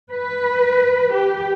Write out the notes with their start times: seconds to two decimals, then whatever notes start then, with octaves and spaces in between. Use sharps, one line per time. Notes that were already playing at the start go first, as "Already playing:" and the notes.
0.11 B4
1.12 G4